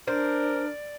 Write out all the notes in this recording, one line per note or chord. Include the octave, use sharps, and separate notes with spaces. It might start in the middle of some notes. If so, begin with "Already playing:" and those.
D4 A#4 C5 D5